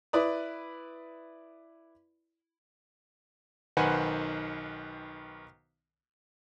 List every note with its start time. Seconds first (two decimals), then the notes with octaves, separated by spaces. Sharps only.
0.13 E4 B4 D5 B5 D#6
3.77 B1 D#3 B4 C5 F#5 G#5